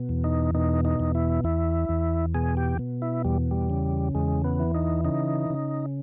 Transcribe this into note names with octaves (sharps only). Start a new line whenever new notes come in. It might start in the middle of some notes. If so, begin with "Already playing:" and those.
Already playing: B2
E2
D#4
B2 D#4
D#4
E2
E4
E2 E4
E2
B2 G#4
G4
B2
E4
E2 G3
G3
C#3
E2 G#3
B3
E3
D#4
C#3 D#4
C#3